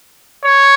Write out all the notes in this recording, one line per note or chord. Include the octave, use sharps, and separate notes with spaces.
C#5